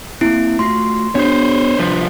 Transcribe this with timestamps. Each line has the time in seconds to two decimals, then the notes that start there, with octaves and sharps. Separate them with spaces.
0.21 A#3 C4 E4
0.59 A3 F4 F#4 C6
1.15 B3 D4 F#4 G#4 C5 C#5
1.79 C2 F3 B4